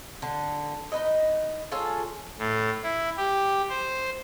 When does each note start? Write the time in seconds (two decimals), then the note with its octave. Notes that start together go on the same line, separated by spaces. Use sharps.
0.22 D3
0.92 D#4 B4 D#5
1.72 F4 G#4 A4 C#5
2.38 A2
2.83 E4
3.17 G4
3.69 C5